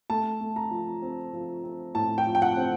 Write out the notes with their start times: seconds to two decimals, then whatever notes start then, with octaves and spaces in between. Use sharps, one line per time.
0.10 A3 A5
0.41 A3
0.56 A#5
0.71 F3
1.02 C4
1.33 F3
1.64 C4
1.95 A2 A5
2.18 G5
2.26 F3
2.35 G5
2.42 F#5
2.57 C4